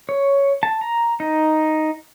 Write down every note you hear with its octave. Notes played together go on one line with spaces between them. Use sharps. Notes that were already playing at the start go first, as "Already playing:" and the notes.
C#5
A5
A#5
D#4